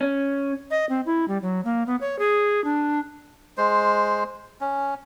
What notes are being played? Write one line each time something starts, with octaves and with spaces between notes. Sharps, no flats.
C#4
D#5
C4
E4
G3
F#3
A#3
B3
C#5
G#4
D4
G#3 C5
C#4